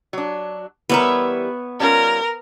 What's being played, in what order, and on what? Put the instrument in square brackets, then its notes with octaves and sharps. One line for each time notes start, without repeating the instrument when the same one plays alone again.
[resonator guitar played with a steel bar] F#3 D4
[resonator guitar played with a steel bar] E3 G3 A#4 [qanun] B3 C#5 E5
[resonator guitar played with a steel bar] G3 C#4 F4 [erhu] A#4